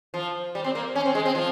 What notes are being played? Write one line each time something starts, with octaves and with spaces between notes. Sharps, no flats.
F3
G3
C4
A#3
C#4
C4
G#3
C4
F3